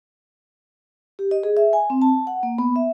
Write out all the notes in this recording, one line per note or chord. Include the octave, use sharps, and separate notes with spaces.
G4
D#5
G#4
E5
G#5
C4
A5
F#5
A#3
B3
E5